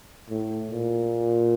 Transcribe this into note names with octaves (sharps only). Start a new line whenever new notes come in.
A2
A#2